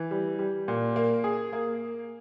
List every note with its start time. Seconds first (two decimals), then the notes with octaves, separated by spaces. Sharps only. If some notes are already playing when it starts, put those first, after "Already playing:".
Already playing: E3
0.11 G3
0.39 G3
0.68 A#2
0.96 A#3
1.24 G#4
1.53 A#3